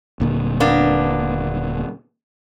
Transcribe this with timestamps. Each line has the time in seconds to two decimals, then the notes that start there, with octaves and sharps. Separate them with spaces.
0.20 D#1 A#2 D3
0.60 A#3 B3 D4